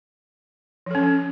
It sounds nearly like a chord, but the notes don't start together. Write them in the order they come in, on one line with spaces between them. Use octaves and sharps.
F3 A4 C#4